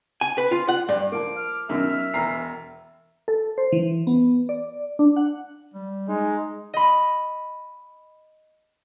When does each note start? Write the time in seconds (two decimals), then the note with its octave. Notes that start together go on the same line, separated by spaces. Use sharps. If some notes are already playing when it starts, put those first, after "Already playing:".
0.21 G#5
0.38 B4
0.51 F4
0.68 F#5
0.89 G2
1.12 F3 A#3 D6
1.36 F6
1.69 F#2 B2 D#3 E5
2.14 E1 E3 A#5 C7
3.28 A4
3.58 C5
3.72 E3
4.07 B3
4.49 D5
4.99 D4
5.16 F#5
5.74 G3
6.09 G#3 D#4
6.74 D#5 B5